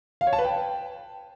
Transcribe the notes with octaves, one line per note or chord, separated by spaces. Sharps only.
F5
C#5
A5
B4
G5